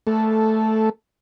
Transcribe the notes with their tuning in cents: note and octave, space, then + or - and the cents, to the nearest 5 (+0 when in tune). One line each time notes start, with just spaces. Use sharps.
A3 +0 A4 -10